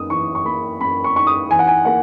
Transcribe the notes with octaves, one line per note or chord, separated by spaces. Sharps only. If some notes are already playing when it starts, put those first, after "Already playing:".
Already playing: F#2 A#3 D#4 D#6
E3 C#6
C#6
A#3 B5
F#2 B5
C#6
D#4 C#6
D#6
E3 G#5
F#5
G#5
A#3 F#5